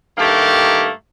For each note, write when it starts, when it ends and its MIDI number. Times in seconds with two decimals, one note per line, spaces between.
0.17 0.88 43
0.17 0.88 51
0.17 0.88 57
0.17 0.88 58
0.17 0.88 67